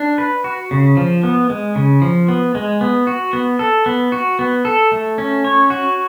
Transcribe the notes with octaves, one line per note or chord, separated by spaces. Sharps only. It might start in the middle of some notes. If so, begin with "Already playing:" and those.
Already playing: D4
B4
F#4
C#3
F3
B3
G#3
C#3
F3
B3
G#3
B3
F#4
B3
A4
B3
F#4
B3
A4
A3
C#4
C#5
F#4